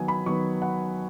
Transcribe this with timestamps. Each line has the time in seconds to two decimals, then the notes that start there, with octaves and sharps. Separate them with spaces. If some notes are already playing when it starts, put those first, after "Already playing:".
Already playing: D#3 F#3 B3 G#5
0.08 B5
0.26 D#3 F#3 B3 C#6
0.62 F#5